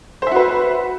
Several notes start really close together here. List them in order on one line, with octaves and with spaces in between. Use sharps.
C5 E5 F#4 B4